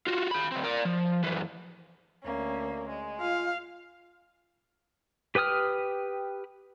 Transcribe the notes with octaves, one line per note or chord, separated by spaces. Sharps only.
F4 F#4
G#4 B5
D2 C4
A#4 D5
F3
F#2 E3
D2 A#3 C#4
G#3
F4 F5
G4 B4 G5 D#6 F6